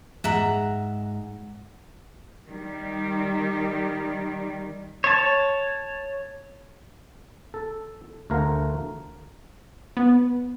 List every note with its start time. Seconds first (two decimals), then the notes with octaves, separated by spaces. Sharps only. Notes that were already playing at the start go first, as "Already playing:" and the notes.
0.24 G#2 E5 F#5 A#5
2.48 D#3 G3
5.04 C#5 A5
7.54 A4
8.30 D2 A3 A#4 F5 F#5
9.97 B3